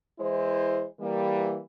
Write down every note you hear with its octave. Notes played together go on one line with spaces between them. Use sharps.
E3 G#3 E4 C5
E3 G3 A#3